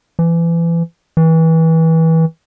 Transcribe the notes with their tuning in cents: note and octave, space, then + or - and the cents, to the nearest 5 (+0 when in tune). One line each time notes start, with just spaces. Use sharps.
E3 +30
E3 -25